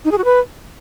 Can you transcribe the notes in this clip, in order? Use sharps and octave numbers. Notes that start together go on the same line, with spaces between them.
D#4
G#4
F#4
B4